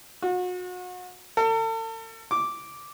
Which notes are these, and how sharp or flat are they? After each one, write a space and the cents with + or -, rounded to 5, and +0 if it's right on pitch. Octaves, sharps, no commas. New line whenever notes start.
F#4 -35
A4 +40
D6 -5